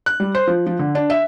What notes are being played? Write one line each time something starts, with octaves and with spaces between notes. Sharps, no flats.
F#6
G3
C5
F3
F3
D3
D4
E5